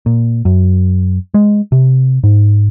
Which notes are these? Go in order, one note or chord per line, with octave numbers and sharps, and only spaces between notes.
A#2
F#2
G#3
C3
G#2